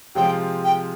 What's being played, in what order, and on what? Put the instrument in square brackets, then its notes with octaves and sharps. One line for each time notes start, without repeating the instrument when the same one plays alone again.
[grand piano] C3 F3 G#3 C4 F4 [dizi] G5
[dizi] G5